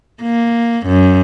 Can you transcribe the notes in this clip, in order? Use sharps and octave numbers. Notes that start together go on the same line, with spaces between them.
A#3
F#2